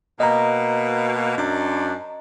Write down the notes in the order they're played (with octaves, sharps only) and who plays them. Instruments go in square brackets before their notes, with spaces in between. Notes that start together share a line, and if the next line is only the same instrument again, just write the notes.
[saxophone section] B2 A#3 [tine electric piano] D#5 A#5
[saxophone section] F#2 D4